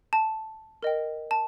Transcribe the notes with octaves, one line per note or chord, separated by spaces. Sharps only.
A5
A#4 D#5 G5
A5